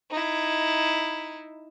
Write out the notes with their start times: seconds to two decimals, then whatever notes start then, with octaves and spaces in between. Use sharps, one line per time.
0.11 D#4 E4